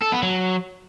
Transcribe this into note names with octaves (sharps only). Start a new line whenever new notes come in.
A4
B3
F#3